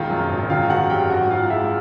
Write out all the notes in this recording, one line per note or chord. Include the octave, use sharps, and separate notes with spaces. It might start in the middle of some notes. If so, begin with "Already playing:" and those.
Already playing: E1 D#3 F4 F5
F#2
G#1
D#3 F4 F5
D#3 F#4 F#5
F#2 G4 G5
G#1 F#4 F#5
G#1 F4 F5
G#3 E4 E5